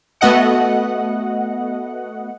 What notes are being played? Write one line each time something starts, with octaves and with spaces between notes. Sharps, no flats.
A3 B3 F#4 D#5 F#5